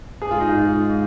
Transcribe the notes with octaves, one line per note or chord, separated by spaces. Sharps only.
G#2 G#4
F4
D#4
F4